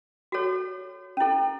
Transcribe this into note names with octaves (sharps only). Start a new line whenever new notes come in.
F#4 A4 C#5
C#4 E4 A4